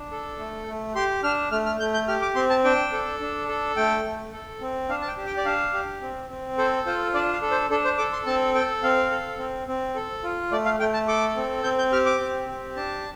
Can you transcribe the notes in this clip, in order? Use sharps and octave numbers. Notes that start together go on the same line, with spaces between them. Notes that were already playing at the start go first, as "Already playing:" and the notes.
Already playing: D4
A4
A3
A3
G4 C6
D4 F6
A3 F6
F6
A3 G6
G6
G4 F6
D6
C4 C6
A5
D4 G5
A4
D4
A4
A3 G5
A3
A4
C4
D4 F5
A5
G5
G4
G5
D5
D4 F5
G4
C4
C4
A4 C5
F4 C5
D4 D5
F5
A4
C5
D4 A4
C5
A4 D6
C6
C4 A5
A4 G5
C4 F5
A4
C4
C4
A4
F4
A3 D5
F5
A3 G5
A5
A4 D6
C4
C4 G6
G6
G4 F6
D6
C4
G4
D4 A5